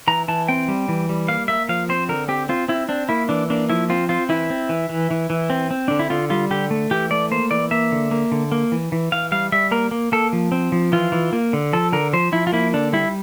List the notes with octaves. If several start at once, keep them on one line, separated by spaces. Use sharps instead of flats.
E3 A#5
E3 A5
C4 G5
G3
E3
G3
A#3 F5
A#3 E5
F3 F5
C4 C5
D3 A#4
C4 G4
C4 F4
C4 E4
C4 D4
A#3 E4
E3 D4
A#3 D4
F3 E4
C4 F4
C4 F4
E3 E4
C4
E3
E3
E3
E3
C4
C4
D3 D4
E4
D3 F4
G3 F4
D3 G4
A3
E3 G4
A3 D5
A#3 C5
E3 D5
A#3 E5
D3
A#3
D3
A#3
E3
E3
E3 F5
G3 F5
G3 E5
A#3 A#4
A#3
A#3 A4
F3
C4
F3
E3 F4
E3
A#3
D3
F3 A4
D3 A#4
F3 C5
F3 E4
F4
A#3 E4
D3 D4
G3 E4